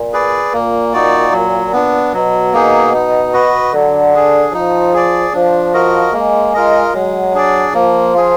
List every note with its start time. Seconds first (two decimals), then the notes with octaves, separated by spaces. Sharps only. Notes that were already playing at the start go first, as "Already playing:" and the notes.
Already playing: A#2
0.13 G#4 B4 D5
0.53 A#2 A#3
0.93 D#4 F#4 D5
1.32 F#3
1.73 B3 D4
2.13 B2 F#3
2.53 A#3 D#4 G#4
2.94 D#4
3.33 F#4 B4 D#5
3.73 D3 F#3
4.13 D4 G#4
4.53 F3 D#4
4.93 G#4 D5
5.33 F3 D4
5.74 F#4 A#4 D#5
6.13 G#3 A#3
6.54 F4 A#4 D#5
6.94 F#3 G#3
7.33 D4 G#4 D5
7.74 F3 A#3
8.14 F4 G#4